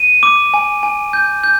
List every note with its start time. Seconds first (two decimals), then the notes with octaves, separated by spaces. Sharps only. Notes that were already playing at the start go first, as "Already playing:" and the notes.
Already playing: D#7
0.23 D6
0.54 G#5
0.83 G#5
1.13 G6
1.43 G6